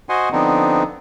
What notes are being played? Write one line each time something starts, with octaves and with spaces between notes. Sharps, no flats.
F#4 C5 D#5 F#5 G#5 C6
D3 F3 B3 C4 D4 D#4